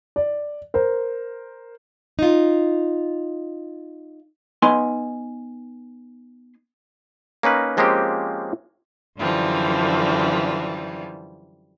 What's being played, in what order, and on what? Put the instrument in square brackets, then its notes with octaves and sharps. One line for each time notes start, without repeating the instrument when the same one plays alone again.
[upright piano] D5
A#4 C5
[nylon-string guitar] D#4 F4
[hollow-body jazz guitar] B3 D#4 G#5 C6
[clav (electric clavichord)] A#3 C#4 D#4 B4
F3 G#3 A#3 C4 C#4 G4
[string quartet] F#2 D3 E3 F3 G3